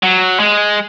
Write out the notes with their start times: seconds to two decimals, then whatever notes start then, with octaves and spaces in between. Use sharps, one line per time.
0.03 F#3
0.40 G#3